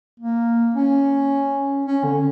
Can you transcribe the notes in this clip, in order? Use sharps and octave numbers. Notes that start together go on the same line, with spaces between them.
A#3
C#4
C#4
D3